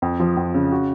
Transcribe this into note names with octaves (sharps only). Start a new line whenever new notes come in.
F2
F3
F2
C#3
F#4